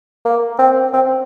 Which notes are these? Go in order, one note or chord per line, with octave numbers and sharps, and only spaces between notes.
A#3
C4
C4